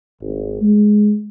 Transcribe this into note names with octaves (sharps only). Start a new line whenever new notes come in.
G#1
G#3